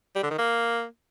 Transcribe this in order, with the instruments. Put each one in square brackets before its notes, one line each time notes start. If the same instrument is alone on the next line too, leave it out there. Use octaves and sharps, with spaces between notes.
[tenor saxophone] G3
D3
D#3
A#3